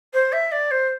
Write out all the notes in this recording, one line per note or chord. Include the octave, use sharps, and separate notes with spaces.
C5
E5
D5
C5